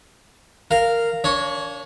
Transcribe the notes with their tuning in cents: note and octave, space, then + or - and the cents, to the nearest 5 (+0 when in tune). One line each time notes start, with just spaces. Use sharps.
A#4 -10 F5 -5
D4 -35 C#5 +0